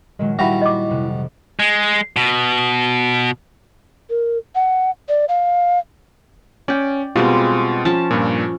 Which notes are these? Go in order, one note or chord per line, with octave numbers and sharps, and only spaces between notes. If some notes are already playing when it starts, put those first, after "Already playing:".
A#2 D#3 F#3 G#3
G3 E4 F#4 E5 F5 G5 A#5 B5
D#5 D6
F2 C3
G#3
B2
A#4
F#5
D5
F5
C#4 D5 G5
B2 G3 G#3 C4 F4
F3 C#4 A5
G2 A#2